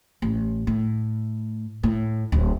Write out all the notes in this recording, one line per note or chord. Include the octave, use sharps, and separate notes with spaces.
A1
A2
A2
D1